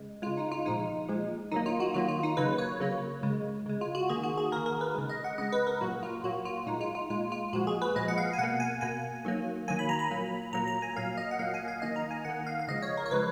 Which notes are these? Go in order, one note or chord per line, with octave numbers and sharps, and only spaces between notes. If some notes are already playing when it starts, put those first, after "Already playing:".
Already playing: C#3 G#3
C#3 G#3 F4
D#4
F4
A#2 F3 G#3 D#4
A#2 F3 G#3
D#3 F#3 A#3 D#4
F4
F#4
D#3 F#3 A#3 F4
F4
D#4
C#3 F#3 A#3 B4
C#5
C#3 F#3 A#3
C#3 G#3
C#3 G#3
F4
F#4
D#3 A#3 G#4
F#4
G#4
D#3 A#3 A#4
A#4
B4
C#3 G#3
D#5
F#5
C#3 G#3 D#5
B4
A#4
A#2 F#3 A#3 F#4
F4
A#2 F#3 A#3 F#4
F4
A#2 G#3 D#4
F4
F4
A#2 G#3 F4
F4
A#2 F3 G#3 F#4
G#4
B4
A#2 F3 G#3 D#5
F#5
F5
G#5
B2 A#3 F#5
G#5
B2 A#3 G#5
D#3 F#3 A#3
D#3 F#3 A#3 G#5
B5
A#5
B5
A#2 F#3 A#3
A#2 F#3 A#3 A#5
A#5
G#5
A#2 F#3 A#3 F5
D#5
F#5
A#2 F#3 A#3 F5
G#5
F5
D#3 A#3 D#5
A#5
G#5
D#3 A#3 F#5
F5
F5
C#3 F3 G#3 D#5
C#5
A#4
C#5
C#3 F3 G#3 B4